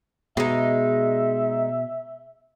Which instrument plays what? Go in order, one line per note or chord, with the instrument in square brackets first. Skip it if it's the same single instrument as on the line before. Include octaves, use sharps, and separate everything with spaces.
[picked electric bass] B2 [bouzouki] G#3 D#4 [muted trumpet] E5